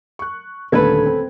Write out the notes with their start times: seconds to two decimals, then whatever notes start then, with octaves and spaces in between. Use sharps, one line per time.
0.19 C#6 F#6
0.72 D#1 D3 A3 A4 B4 G#6
1.06 C4